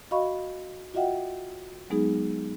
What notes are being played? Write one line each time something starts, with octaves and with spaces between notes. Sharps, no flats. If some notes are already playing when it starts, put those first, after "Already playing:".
F#4 D#5 F5 B5 C#6
F4 F#4 D#5 E5 F#5 G5
F#3 G#3 B3 D#4 G#4